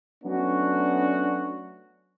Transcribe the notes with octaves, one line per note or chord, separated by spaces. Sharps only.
F#3 A3 B3 C#4 D4 F#4